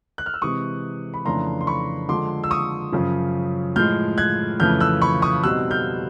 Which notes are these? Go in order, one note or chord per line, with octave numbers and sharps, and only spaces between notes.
F#6
F6
E6
C3 E3 G#3 C#6 D#6
B5
F2 C#3 E3 A3 D4 A#5 C6
C6
B5 C#6
D3 F3 G#3 C6 D6
E6
C#6 D#6
F#2 C#3 F3
A2 F3 G#3 F6 G6
F#6 G#6
F2 C#3 E3 A3 F6 G6
E6 F#6
B5 C#6
C#6 D#6
B2 G3 C4 D#4 E6 F#6
F6 G6